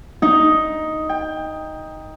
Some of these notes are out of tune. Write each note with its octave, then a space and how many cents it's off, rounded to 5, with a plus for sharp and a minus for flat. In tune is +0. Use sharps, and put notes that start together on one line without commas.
D#4 +5
G5 +20